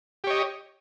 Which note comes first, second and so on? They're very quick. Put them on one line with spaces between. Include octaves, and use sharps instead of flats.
G4 C#5 D#5